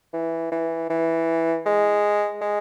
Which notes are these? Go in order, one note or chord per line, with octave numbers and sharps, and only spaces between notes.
E3
E3
E3
G#3
G#3